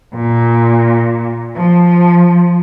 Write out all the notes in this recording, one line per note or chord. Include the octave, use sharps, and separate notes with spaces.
A#2
F3